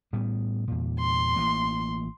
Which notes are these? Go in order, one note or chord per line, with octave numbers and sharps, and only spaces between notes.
A2 G3 B3
E2 A#2
C6
A1 E3 A#3